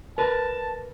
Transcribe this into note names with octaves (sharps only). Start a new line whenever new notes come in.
A#4 B4 A5